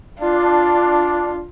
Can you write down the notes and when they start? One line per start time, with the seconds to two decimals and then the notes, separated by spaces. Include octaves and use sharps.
0.20 D4 F4